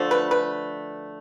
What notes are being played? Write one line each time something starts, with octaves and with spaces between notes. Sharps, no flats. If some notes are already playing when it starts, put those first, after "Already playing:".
Already playing: D3 F3 A3
B4
B4